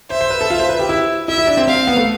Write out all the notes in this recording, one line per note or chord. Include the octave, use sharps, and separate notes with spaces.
C5 E5
C5
B4
A4
F4
C5
B4
G4
E4
E4 E5
E4
D4
C4
C4 F5
B3
A3